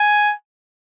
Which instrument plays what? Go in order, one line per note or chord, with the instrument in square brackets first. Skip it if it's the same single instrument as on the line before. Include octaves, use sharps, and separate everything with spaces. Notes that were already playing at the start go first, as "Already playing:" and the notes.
Already playing: [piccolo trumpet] G#5